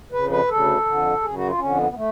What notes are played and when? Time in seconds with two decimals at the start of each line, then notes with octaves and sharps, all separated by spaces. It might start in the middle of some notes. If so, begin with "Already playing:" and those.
0.12 F2 C#3 B4
0.30 B4
0.49 D2 C#3 A4
0.85 F2 D3
1.22 F#2 C#3 G#4
1.35 F#4
1.47 F4
1.58 F2 D3 C#4
1.77 B3
1.90 B3
1.96 A3